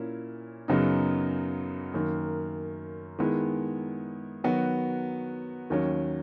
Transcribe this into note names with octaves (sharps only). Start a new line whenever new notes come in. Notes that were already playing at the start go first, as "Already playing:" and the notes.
Already playing: A#2 A#3 C#4 E4
F#2 C#3 F#3 B3 D#4
F#2 D#3 A#3
D#3 G#3 B3 E4
D#3 F#3 B3 F#4
D#2 D#3 F#3 C#4